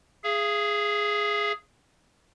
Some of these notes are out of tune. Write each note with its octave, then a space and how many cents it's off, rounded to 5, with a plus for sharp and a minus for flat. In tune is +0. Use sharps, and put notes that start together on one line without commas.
G#4 +0 F5 -40